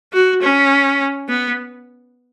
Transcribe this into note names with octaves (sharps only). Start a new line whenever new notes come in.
F#4
C#4
B3